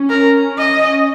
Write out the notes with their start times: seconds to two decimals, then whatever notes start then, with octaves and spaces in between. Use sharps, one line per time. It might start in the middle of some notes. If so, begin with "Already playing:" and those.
Already playing: C#4
0.10 A#4
0.58 D#5